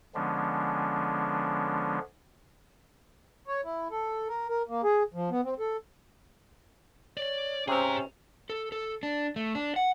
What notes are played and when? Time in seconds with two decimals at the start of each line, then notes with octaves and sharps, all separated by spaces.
0.15 D3 F3 G#3 B3 C#4 D4
3.47 C#5
3.65 E4
3.91 A4
4.28 A#4
4.49 A#4
4.69 A#3
4.84 G#4
5.14 F3
5.31 B3
5.45 C4
5.59 A4
7.17 C#5 D5
7.68 C3 C4 C#4 G#4 C5 A#5
8.50 A4
8.72 A4
9.03 D4
9.36 A3
9.55 D4
9.76 F#5